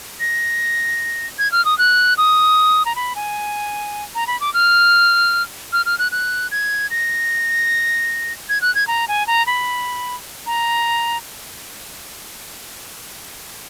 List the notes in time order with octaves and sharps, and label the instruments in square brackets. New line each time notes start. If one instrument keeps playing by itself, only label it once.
[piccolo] A#6
G#6
F6
D#6
F#6
D#6
A#5
B5
G#5
A#5
B5
D6
F6
F6
F6
F#6
F#6
G#6
A#6
G#6
F#6
G#6
A#5
G#5
A#5
B5
A#5